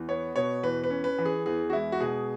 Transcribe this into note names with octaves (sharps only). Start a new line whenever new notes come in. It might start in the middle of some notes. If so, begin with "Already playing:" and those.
Already playing: E2
B3 C#5
B2 C#5
E2 B4
B4
C#4
B4
E3
G#4
E2 G#4
F#4
G#3 E4
F#4
B2 G#4